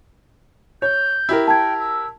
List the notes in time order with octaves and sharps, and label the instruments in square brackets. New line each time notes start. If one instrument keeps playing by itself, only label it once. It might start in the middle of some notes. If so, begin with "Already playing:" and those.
[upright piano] C#5 [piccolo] G6
[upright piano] E4 G4 A#4
[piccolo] G5 [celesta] A5 G#6
[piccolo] E6